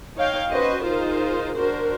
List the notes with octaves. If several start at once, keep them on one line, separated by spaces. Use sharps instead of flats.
D#4 C#5 F5 G5
C#4 F#4 B4 C5 D#5
D#4 F4 G#4 A#4 C5
D4 F#4 A#4 C5